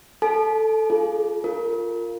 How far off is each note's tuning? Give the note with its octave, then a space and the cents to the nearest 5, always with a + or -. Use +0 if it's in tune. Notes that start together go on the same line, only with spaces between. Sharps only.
A4 +0 A5 -40
F4 -10 G#4 +30
F4 +0 A#4 -20